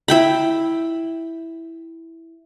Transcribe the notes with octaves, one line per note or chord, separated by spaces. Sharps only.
E4 G5 B5